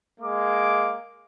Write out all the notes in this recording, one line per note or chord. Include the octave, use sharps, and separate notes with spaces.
G#3 A#3 D6